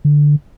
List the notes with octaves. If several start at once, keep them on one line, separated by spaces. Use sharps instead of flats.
D3